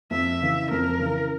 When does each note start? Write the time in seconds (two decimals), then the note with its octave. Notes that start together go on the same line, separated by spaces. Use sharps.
0.11 F2 E5
0.41 C#3 E3
0.71 F2 A#4
1.00 C#3 E3